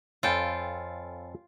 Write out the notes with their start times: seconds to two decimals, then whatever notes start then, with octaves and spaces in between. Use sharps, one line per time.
0.23 F2 F4 A4 C#5 D5 G5 G#5 B5